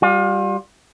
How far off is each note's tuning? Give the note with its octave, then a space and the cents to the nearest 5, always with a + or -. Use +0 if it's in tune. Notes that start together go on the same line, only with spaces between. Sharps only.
G3 +0 F4 +35